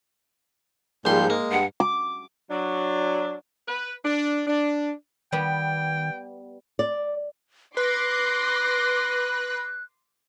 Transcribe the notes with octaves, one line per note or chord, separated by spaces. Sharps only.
A#1 G#2 F3 G3 C6 G6
G#3 A#3
G2 F#5
D6
F#3 D4
B4
D4
D4
D#3 G3 B3 G5
D5
B4 C6 D6 F#6 A#6